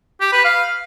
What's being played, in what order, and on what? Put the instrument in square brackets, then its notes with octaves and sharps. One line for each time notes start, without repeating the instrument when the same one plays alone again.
[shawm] G4
B4
F5